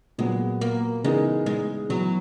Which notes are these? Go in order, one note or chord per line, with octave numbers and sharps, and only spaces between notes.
A#2 F#3 G#3 B3
A#3
C#3 E3 G#3 B3 D#4 A#4
G#3
E3 F#3 B3 F#4